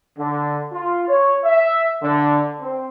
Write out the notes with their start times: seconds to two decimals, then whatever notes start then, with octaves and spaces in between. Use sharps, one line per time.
0.17 D3
0.71 F4
1.07 C#5
1.43 E5
2.01 D3
2.59 C4